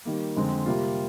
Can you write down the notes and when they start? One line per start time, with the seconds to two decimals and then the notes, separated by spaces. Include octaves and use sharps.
0.05 D#3 G3 A#3
0.36 F2 D3 G#3 C4
0.66 C3 G3 A#3 F4